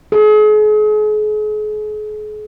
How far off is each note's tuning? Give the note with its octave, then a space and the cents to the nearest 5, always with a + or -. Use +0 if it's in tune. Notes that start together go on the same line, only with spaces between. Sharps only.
G#4 +40